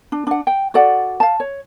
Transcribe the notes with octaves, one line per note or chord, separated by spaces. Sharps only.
D4
D4 F#5
G5
F#4 A4 D5 F#5
F5 A5
C#5